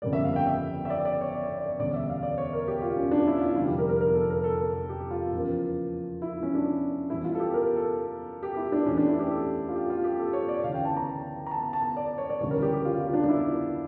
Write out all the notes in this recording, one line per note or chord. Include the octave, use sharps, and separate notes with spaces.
G1 F2 C#3 G3 A#3 D5
E5
F5
G5
E5
E5
D5
D5
C#5
D5
D5
E1 D2 C#3 G3 D5
E5
F5
D5
C#5
A#4
G4
F4
C#4
D4
E4
F4
F1 F2 D3 G3 F4
G4
A#4
A#4
A#4
A4
A#4
A4
G4
F4
E2 C#3 F3 A#3
E4
C#4
D4
E2 E3 G3 E4
F4
A4
G4
A#4
A4
G4
E4
D4
E2 E3 A3 C#4
D4
E4
G4
A4
F4
G4
F4
G4
A4
C#5
D5
D2 C#3 E3 F5
G5
A5
A#5
A#5
A5
A5
D5
C#5
D5
D2 C#3 E3 G3 C#5
A#4
G4
G4
F4
F4
D4
D4
E4